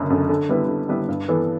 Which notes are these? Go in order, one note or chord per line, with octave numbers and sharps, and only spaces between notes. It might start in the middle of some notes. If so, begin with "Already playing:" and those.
Already playing: F#1 F#2 D3
F#2 D3
D3
G3 B3 E4 B4
D3
G3 B3 E4 B4
G2
E3 B3 D4 A4